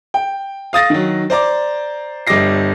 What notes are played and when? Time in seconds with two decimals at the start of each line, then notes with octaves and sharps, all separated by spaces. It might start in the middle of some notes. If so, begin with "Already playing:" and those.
0.14 G5
0.73 F5 D#6 A6 A#6
0.90 D#3 F#3
1.30 C5 D5 A#5 D6
2.27 G1 G3 D#5 D6 A#6 C7